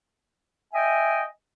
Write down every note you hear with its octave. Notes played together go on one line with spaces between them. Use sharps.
D#5 E5 G5 G#5